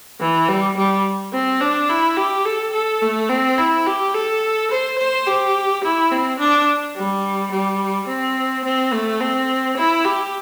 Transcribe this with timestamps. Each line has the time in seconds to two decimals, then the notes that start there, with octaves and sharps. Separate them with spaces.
0.20 E3
0.49 G3
0.77 G3
1.33 C4
1.61 D4
1.89 E4
2.17 G4
2.45 A4
2.73 A4
3.02 A3
3.29 C4
3.58 E4
3.87 G4
4.14 A4
4.71 C5
4.98 C5
5.27 G4
5.84 E4
6.11 C4
6.39 D4
6.96 G3
7.51 G3
8.08 C4
8.64 C4
8.93 A3
9.20 C4
9.77 E4
10.05 G4